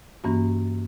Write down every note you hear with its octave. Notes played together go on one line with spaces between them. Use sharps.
G2 E3 A#3 C#4 F#4